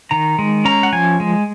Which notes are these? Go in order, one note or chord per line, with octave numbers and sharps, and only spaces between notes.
D#3 A#5
G#3
C#4 A#5
F#5
F3 G#5
G#3